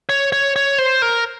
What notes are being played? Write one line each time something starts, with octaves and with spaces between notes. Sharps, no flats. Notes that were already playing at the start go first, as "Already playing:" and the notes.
C#5
C#5
C#5
C5
A#4